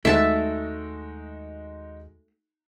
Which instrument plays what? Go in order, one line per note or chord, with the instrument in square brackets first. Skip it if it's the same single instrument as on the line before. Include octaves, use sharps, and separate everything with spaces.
[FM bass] D#2 [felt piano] G#3 D#4 F#4 [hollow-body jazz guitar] A3 [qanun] E5 A5